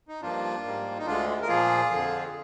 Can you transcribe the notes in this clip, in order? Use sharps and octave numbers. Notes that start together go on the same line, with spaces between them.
D#4
G2 F3 A#3 D4 F4
G#2 G3 A#3
D#4
D2 D3 G#3 D4 F4
A#4
A#2 F3 A#3 F4 G#4
F2 D3 F3